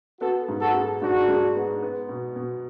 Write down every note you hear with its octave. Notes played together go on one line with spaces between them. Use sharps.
B3 F#4 A4
G#2
F#4 A4
G#3
G#2 D4 F#4
G#3
B3
B3
B2
B2